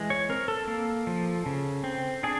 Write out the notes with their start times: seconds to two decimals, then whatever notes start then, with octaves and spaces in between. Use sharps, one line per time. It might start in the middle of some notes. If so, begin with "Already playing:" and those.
Already playing: E3 G#3
0.10 C#5
0.29 C4 A#4
0.48 A4
0.68 A#3
1.07 F3
1.46 C#3
1.84 C4
2.23 D4 G#4